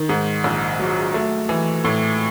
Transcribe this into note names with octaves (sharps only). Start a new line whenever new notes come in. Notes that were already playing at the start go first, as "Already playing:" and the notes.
Already playing: D#3
G#2
A#1
F#3
A3
E3
A2